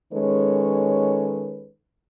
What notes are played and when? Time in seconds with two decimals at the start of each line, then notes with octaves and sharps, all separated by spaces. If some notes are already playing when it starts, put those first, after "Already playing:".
0.12 D#3 G#3 C#4 A4 B4 C#5